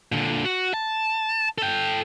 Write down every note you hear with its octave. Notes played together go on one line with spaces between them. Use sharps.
A#2 D3
F#4
A5
A4 G5